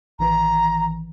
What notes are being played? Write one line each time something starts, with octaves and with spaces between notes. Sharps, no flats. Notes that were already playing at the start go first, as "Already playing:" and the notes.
A1 D#3 E3 A#5